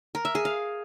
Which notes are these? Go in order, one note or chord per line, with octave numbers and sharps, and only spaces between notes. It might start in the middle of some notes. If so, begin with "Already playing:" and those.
A#4
E5
G#4
F5